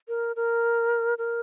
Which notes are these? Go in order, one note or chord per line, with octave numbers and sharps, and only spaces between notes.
A#4
A#4
A#4